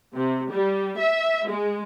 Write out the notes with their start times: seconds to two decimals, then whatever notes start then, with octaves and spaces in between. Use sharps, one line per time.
0.17 C3
0.51 G3
0.98 E5
1.48 G#3